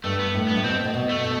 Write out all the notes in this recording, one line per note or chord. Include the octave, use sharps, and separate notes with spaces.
G2 A3
B3
A2
G2 B3
A2
B2 C4
A2
B2
A3
B2